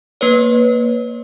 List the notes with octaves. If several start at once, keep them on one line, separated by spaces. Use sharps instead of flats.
A#3 B4 C#5